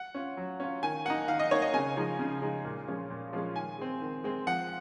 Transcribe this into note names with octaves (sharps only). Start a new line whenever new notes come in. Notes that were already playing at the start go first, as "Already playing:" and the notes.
Already playing: F#5
C#4 F4
F#3
C#4 F4
D#3 G#5
A#3 D#4 F#5
D#3 F5
D#5
A#3 D#4 C#5
D#5
C#3 G#5
F3 G#3 D#4
C#3
F3 G#3 D#4
A#2
F3 G#3 C#4 F4
A#2
F3 G#3 C#4 F4
D#3 G#5
G#3 C4
D#3
G#3 C4
F3 F#5